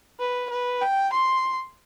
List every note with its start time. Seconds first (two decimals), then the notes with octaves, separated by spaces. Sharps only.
0.20 B4
0.50 B4
0.82 G5
1.13 C6